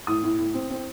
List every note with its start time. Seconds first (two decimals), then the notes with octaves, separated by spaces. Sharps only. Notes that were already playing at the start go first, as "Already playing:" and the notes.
0.07 A2 D#6
0.23 A2
0.39 A2
0.54 C4
0.70 C4